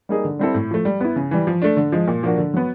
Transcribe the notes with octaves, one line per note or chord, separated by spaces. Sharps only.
G3 A#3 D#4 G#4
D3
G3 C4 E4 A4
A2
F3 A3
G3
B3 E4
C#3
E3 G3
F3
A3 D4
D3
F3 G#3
A#2
F3 A#3 D4 F#4
D3
F#3 B3